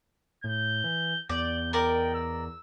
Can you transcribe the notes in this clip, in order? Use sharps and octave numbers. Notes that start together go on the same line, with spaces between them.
A2 G6
E3
E2 D5 G6
A#4 D5 D#5 G5
E6